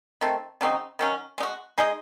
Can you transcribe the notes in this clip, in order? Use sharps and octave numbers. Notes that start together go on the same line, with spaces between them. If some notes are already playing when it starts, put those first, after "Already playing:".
D#3 A3 C4
C#3 F#3 C4 D#4
D#3 F#3 C#4
G#3 D#4
F#4
G#3 D#4 G#4 D#5